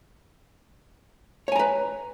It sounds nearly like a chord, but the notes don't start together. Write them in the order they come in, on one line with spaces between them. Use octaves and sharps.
C#5 G#5 A#5 B4